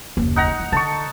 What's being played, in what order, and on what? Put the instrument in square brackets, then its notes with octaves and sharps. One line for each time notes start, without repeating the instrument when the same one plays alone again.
[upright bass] F#1 D#2
[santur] D#4 F#5 A#5
[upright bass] E3
[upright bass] D3 [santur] A5 C#6